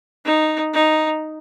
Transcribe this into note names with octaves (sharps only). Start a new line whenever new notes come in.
D#4
D#4